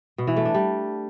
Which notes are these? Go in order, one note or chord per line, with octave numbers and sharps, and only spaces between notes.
B2
E3
A3
D4
G3